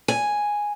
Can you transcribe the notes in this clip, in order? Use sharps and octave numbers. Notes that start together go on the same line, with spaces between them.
G#5